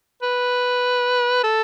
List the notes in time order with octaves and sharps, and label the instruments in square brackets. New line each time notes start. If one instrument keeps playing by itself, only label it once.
[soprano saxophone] B4
A4